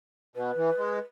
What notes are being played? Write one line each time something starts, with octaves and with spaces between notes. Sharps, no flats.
B2 B4
E3
G#3